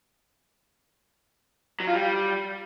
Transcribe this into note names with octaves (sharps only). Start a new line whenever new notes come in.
F#3
F4
G3